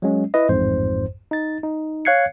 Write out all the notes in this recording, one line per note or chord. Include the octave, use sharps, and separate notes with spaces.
F#3 G#3 C#4
E4 B4 D#5
A1 F2 G#2 C5
D#4 A6
D#4
C#5 F5 F#6 G#6 C7 C#7